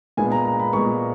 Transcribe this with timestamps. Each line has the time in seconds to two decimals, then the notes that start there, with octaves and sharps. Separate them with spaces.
0.17 A#2 G#3 B3 G#5
0.32 A#5
0.45 A#5
0.60 B5
0.73 A#2 G#3 B3 C#6